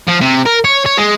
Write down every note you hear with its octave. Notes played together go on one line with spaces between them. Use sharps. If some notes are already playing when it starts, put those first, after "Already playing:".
F3
C3
A#4
C#5
C#5
G#3